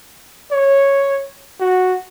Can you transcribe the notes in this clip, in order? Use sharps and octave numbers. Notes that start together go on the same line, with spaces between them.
C#5
F#4